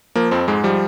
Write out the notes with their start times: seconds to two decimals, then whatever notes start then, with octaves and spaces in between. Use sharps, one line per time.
0.15 F3 A#3
0.31 F2 C4
0.48 G#2 G#3
0.64 F3 G3